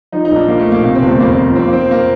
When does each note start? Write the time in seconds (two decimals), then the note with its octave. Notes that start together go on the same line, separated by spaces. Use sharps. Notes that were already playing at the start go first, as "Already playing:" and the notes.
0.12 F3 D#4
0.25 D#4
0.31 A#1
0.36 D4
0.48 F3 A#3
0.60 A3
0.66 A#1
0.72 A#3
0.84 C3 A#3
0.95 C4
1.02 G1
1.07 A3
1.19 F2 A#3
1.32 C4
1.37 F2
1.56 F3 C4
1.67 A#3
1.73 F3 C4
1.91 A#3